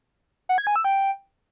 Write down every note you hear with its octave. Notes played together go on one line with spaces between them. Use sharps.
F#5
G#6
G#5
E6
G5